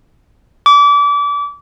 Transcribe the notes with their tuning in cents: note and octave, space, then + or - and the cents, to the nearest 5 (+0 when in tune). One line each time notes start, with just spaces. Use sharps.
D6 -30